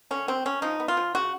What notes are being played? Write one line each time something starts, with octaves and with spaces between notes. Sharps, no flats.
D3 C#4
F#3 C4
F#3 C#4
F3 D#4
B3
F4
F3
C#3 F#4